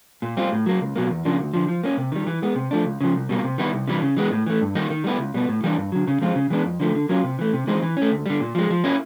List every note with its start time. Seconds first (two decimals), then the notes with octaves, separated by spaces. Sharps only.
0.22 A#2
0.37 G3 C4 F4
0.52 A2
0.66 F#3 A#3
0.81 C#2
0.96 B2 F#3 A#3
1.10 E2
1.25 C#3 F3 A#3 D4
1.39 D2
1.54 D3 F3
1.68 F3
1.84 A#3 C#4
1.97 C3
2.12 D#3 G3
2.27 E3
2.42 G#3 B3
2.56 C3
2.71 F3 A3 D4
2.85 C#2
3.01 C#3 F3
3.15 C2
3.29 B2 G3 A#3
3.44 C3
3.58 D#3 G3 B3 E4
3.73 C2
3.88 C3 E3 G3
4.02 C#3
4.17 E3 G#3 B3
4.31 A2
4.46 E3 A3
4.61 G2
4.75 D#3 G3 A#3 D#4
4.90 D#3
5.04 G3 B3 E4
5.19 C#2
5.34 B2 G3 B3
5.49 A2
5.64 E3 G3 A#3 D4
5.78 G2
5.92 D3 F#3
6.07 C#3
6.21 F3 G#3 C4 F4
6.36 C#3
6.50 E3 G#3 B3 D4
6.65 F2
6.80 D3 F3 A3
6.95 D3
7.09 F#3 A#3 C#4 F4
7.24 C3
7.39 E3 A3
7.53 C3
7.67 E3 G#3 C4 D#4
7.82 E3
7.97 A3 C#4
8.11 D2
8.26 D3 G3
8.40 A#2
8.55 F3 G#3
8.70 F3
8.84 A#3 C#4 E4